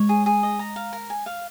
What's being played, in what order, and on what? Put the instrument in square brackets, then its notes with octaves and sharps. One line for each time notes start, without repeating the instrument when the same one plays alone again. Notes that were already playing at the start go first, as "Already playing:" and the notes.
Already playing: [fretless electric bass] G#3 [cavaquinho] C#5
[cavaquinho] G#4
G#4
D#5
A#5
F5
A#4
G#5
F5